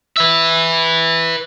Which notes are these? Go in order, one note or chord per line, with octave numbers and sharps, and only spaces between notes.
B4 E5